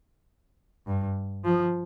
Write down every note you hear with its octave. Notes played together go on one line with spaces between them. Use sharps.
G2
F3